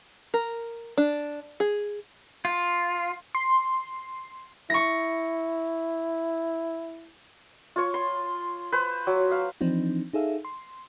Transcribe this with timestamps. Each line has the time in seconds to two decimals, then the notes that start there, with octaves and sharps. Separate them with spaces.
0.34 A#4
0.98 D4
1.60 G#4
2.45 F4
3.35 C6
4.70 E4 C#6 A#6
7.76 F4 C#5
7.94 C6
8.72 B4 C5
9.07 F#3
9.31 F5
9.61 E3 F3 C4 D4 D#4
10.13 D#4 G#4 A4 E5 F5
10.45 C6